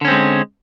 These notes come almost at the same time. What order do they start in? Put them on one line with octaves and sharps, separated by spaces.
D3 C#4 C4 G#3